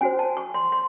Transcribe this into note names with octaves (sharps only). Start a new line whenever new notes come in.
C#4 F#4 C5 G#5
A5
C#6
C6
C6